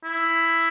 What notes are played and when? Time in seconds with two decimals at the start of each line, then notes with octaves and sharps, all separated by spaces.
0.04 E4